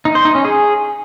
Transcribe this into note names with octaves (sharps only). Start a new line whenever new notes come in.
D#4
C5
D#4
C#4
G#4